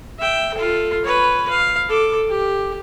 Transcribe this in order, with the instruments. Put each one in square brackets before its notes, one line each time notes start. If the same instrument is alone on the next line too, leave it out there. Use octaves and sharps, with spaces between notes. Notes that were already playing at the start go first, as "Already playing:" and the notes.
[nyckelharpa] E5 G5
F4 A4
B4 C#5
F5
A4 D6
G4